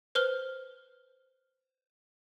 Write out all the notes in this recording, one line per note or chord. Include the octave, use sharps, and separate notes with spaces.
B4 C5 F6 G7